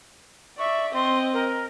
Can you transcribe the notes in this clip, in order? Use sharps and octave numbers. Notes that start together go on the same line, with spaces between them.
D5 E5 C#6
C4 D#5 C6
A#4